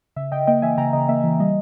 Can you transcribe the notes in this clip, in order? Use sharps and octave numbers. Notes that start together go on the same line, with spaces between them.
C#3 E5
C#3 D#5 G5
A#3 D#5 G5
E3 E5 G#5
C#3 G5 A#5
C#3 D#5
A#3 E5
E3
G3 D#5